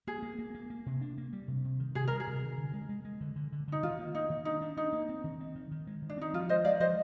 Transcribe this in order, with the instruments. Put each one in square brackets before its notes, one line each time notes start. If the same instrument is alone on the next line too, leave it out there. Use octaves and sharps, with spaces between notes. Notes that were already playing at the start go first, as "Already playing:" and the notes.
[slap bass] A#3 [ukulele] G#4
[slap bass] A#3
A#3
A#3
A#3
C3
D4
A#3
G3
C3
C3
D#3
[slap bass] C3 [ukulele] G#4
[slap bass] G3 [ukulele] A#4
[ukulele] G#4
[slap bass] C3
D#3
D3
G#3
G#3
G#3
D3
D3
D3
[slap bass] D3 [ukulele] D#4
[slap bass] D#3 [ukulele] F4
[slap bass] A#3
[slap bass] A#3 [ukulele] D#4
[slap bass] D#3
[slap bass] D4 [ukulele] D#4
[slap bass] D4
[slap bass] D4 [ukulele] D#4
[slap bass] A#3
C4
D#3
C4
D#3
D#3
G#3
D#3
[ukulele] D4
[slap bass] C4 [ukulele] D#4
[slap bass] F3 [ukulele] F4
[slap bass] G#3 [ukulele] C5 D#5
[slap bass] G#3 [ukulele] D5 F5
[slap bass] F3 [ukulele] C5 D#5